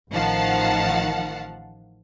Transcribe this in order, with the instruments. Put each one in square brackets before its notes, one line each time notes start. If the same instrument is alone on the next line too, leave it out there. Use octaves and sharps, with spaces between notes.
[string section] A1 D#3 F3 F5 F#5 A5